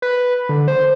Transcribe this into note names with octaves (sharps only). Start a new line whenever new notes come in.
B4
D3
C5